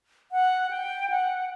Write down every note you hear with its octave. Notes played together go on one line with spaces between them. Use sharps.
F#5
G5
F#5